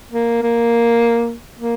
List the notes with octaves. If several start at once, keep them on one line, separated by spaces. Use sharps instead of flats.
A#3
A#3
A#3